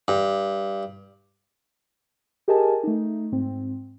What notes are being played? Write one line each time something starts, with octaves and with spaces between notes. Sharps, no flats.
G2
G4 G#4 A#4 D#5 G#5 A5
A3 D#4
G#2 C4